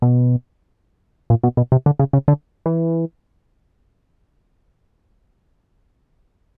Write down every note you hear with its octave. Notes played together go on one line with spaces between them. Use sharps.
B2
A#2
B2
B2
C3
D3
C#3
C#3
D3
E3